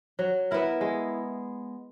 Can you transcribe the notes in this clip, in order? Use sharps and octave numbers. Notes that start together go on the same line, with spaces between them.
F#3
B3 E4 A#4
G#3